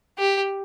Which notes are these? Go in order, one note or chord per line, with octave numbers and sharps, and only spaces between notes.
G4